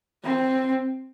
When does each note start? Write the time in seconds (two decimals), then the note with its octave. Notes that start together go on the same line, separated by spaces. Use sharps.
0.24 C4